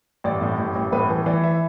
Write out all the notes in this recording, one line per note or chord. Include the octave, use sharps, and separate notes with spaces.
A1 D5
A2
A1
A1
A2 B4
E3
E3 D5
E5